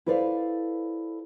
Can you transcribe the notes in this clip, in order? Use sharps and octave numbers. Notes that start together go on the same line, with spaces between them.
E4 A4 B4 C5 D5 F5